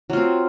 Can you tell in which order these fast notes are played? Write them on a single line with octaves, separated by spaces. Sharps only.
F#3 F4 C4